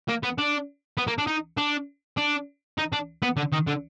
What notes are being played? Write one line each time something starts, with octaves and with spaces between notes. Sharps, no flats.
A#3
B3
D4
B3
A#3
D4
D#4
D4
D4
D#4
D4
B3
D3
D#3
D3